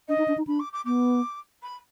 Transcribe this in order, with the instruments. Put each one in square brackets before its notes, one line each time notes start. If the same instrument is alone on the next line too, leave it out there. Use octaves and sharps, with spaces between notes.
[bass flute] D4 [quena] D#5
[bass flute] D#4
D4
D#4
[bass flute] D4 [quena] B5
[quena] D6
D6
[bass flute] B3 [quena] D6
[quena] B5